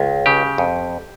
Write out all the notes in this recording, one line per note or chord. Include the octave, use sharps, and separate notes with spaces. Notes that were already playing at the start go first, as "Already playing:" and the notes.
Already playing: C#2
C#3 G4
F2